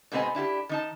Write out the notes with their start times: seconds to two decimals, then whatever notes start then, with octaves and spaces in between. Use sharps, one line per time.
0.12 G#2 C3 B3 C4 D#5 G#5
0.35 D4 E4 F4 G4
0.69 D#3 D#4 A5